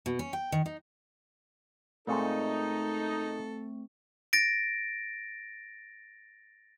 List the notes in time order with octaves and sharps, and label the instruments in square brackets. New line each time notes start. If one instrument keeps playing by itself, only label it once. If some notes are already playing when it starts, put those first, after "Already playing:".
[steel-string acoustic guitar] B2
C#4
G5
D#3
D#4
[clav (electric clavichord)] A#2 G#3 [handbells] A3 C4 C#6 [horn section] D#4 [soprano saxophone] A4
[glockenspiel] A6 A#6 D7